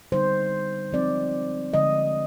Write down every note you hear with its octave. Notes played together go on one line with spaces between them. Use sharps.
D3 G3 B3 D#4 C5
F3 G#3 C4 D#4 D5
D3 F3 G#3 D#5